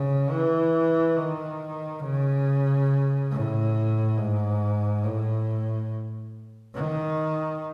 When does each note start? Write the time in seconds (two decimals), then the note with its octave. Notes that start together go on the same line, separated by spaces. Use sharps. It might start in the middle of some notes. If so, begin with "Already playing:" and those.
Already playing: C#3
0.31 E3
1.17 D#3
2.03 C#3
3.31 A2
4.17 G#2
5.04 A2
6.76 D#3